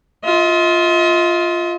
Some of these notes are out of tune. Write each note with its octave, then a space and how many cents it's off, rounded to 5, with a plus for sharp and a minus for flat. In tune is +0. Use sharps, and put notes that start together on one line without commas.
F4 +0 D#5 +45